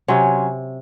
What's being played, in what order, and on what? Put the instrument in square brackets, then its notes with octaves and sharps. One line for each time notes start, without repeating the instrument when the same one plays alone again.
[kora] C3 F#3 C#4 [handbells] G#5 C6